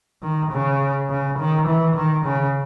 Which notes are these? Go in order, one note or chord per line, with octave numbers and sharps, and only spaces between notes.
D#3
C#3
C#3
D#3
E3
D#3
C#3